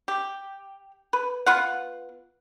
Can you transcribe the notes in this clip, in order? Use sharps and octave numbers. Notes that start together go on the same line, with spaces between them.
G4
B4
B3 F4 F#5